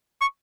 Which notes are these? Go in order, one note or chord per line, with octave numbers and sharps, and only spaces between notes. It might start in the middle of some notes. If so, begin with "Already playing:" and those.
C#6